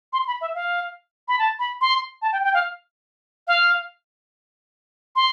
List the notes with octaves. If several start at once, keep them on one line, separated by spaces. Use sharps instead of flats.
C6
B5
E5
F5
B5
A5
B5
C6
A5
G5
G5
F5
F5
C6